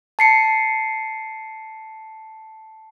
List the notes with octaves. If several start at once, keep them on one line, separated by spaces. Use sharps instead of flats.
A5 C7 C#7